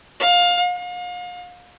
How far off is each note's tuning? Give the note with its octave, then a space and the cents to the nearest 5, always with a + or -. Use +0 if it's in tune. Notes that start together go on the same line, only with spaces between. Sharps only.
F5 +20
F5 +40